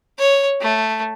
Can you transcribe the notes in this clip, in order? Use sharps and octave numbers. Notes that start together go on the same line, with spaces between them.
C#5
A3